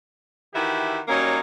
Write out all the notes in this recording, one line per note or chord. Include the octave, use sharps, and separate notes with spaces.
D#3 E3 E4 F#4 G4
F#3 G3 A#3 C#4 D#4